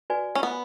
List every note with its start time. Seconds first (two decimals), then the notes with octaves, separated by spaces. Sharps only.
0.10 F#4 B4 D5 G#5
0.35 C#4
0.43 B3